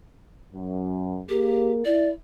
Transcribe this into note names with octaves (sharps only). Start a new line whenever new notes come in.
F#2
A#3 G4 G#4 A#4
E4 D5